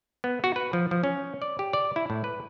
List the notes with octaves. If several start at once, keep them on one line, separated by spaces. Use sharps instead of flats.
B3
F#4
B4
F3
F3
C#4
D5
G4
D5
E4
A2
B4